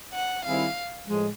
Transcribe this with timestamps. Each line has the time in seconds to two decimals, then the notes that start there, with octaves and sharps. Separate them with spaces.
0.14 F#5
0.44 D#3 G3 C4 E4 G#4 F5
1.07 A2 F3 G#3